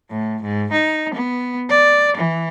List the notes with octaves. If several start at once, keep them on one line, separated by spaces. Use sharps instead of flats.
A2
G#2
D#4
B3
D5
E3